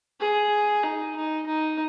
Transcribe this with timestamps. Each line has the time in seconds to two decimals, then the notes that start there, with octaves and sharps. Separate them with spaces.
0.20 G#4
0.83 D#4
1.16 D#4
1.46 D#4